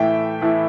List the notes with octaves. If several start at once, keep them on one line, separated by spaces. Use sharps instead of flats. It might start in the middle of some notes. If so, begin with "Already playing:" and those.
Already playing: A2 E3 A3 E5 G5
A2 E3 A3